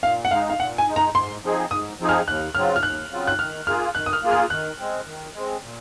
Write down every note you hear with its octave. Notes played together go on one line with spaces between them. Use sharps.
A#2 F5
F#5
G#3 D#4 F5
F5
A#2 F#5
G#5
G#3 D#4
A#5
G#2 C6
F3 C4 D#4 G#4
G#2 D#6
F3 C4 D#4 G#4
F6
D#2 F#6
C#3 F#3 C4 F4 F6
F6
D#2 F#6
C#3 F#3 C4 F4
F#6
D#3 F6
A#3 F4 G#4 F6
D#3 F#6
D#6
F6
A#3 F4 G#4
F6
D#3 F#6
G#3 C4
D#3
G#3 C4
A#2